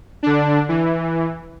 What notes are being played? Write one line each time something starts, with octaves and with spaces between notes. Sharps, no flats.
D3 D4
E3